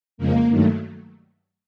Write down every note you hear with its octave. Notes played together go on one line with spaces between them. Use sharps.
F2 C#3 F3 G#3 A#3
G2 D#3 F#3 A3